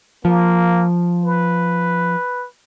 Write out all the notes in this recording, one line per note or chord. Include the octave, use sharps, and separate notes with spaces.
F3 A#3
B4